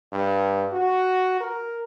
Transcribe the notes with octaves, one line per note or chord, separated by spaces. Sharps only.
G2
F#4
A#4